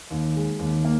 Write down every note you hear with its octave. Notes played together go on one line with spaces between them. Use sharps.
D#2
G#3
D#2
A#3